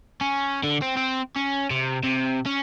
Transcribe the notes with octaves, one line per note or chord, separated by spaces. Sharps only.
C#4
D3
C4
C4
C#4
C3
C3
C#4